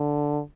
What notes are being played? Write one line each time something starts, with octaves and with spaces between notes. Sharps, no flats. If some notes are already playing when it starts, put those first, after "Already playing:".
Already playing: D3